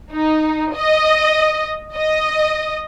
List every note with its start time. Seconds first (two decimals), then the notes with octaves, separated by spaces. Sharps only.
0.13 D#4
0.75 D#5
1.94 D#5